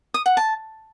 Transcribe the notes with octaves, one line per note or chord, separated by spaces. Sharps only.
D#6
F#5
A5